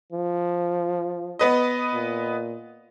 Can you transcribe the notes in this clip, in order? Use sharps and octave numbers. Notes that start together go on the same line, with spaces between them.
F3
B3 B4 D#5
A#2